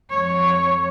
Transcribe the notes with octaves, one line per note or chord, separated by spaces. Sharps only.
F2 C#5